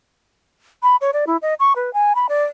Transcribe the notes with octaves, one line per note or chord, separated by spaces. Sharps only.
B5
C#5
D5
E4
D#5
C#6
B4
G#5
B5
D5